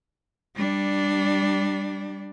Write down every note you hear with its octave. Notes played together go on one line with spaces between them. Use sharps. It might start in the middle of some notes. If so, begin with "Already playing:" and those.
G3 D4